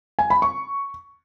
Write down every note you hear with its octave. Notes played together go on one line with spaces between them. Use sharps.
G#5
B5
C#6